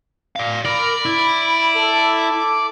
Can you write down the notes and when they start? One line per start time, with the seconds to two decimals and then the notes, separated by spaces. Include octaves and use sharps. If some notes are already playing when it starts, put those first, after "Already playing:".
0.36 D5 F5
0.65 A#4 D5 B5
1.05 E4
1.75 A4